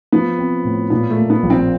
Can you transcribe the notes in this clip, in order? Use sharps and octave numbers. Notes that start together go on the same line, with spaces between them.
F3 B3
C4
A2
A#2 B3
A3
A#3
B3
A#1
C4